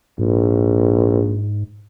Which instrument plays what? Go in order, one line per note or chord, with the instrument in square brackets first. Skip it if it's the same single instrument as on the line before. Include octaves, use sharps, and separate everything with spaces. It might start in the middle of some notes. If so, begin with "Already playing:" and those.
[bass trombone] A#1 [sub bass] G#2